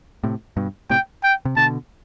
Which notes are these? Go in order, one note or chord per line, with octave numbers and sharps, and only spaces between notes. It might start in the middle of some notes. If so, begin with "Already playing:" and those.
A2 C3
G2 B2
A2 C3 G5
G5
C3
B2 D3 A5